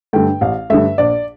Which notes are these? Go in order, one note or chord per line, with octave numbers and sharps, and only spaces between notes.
G2 D3 A3 G5
A1 F5
G2 D3 A3 E5
A#1 D5